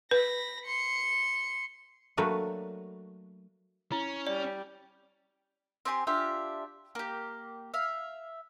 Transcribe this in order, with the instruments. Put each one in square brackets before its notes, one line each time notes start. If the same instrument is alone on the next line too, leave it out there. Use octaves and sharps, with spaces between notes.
[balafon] B4 [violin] B5 A#6
[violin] C6 C#7
[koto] F#3 A3 A#3 D4 B4
[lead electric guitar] C#4 [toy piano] E4
[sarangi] G3 [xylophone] D5
[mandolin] C4 G4 G#5 C6
D4 F4 G4 E5
A#3 G4
E5 F5